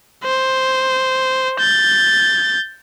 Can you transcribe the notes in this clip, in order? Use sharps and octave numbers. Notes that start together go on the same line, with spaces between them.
C5
G6 A6